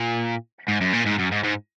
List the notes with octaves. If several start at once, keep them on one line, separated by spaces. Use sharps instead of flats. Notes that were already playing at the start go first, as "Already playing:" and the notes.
Already playing: A#2
G#2
F#2
A#2
G#2
F#2
G#2
G#2